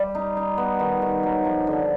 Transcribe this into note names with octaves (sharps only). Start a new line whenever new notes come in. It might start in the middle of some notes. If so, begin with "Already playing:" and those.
Already playing: G3
D#4
D#4
B3
D#3
D#3
F#3
F3
D3